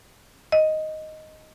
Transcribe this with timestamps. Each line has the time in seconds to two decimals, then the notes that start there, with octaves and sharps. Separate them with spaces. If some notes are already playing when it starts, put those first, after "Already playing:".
0.52 D#5